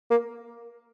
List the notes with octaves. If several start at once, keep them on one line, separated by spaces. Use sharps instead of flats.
A#3